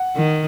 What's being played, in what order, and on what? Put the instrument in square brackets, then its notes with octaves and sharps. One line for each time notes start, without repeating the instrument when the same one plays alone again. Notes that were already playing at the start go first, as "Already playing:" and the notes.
Already playing: [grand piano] F#5
[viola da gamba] D#3